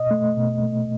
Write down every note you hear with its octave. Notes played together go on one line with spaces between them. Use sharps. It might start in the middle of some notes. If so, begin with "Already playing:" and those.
Already playing: B2 D#5
A3
B2
A3